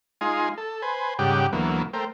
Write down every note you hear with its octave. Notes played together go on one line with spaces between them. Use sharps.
G#3 D#4 F4 G#5 C6
A4
B4 C5 G#5
G#2 C#3 G3 G4 F#5 G5
D2 E3 F#3 A#3 B3
A3 A#4 C5 G5